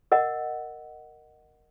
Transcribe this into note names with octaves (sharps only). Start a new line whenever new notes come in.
A#4 D#5 F#5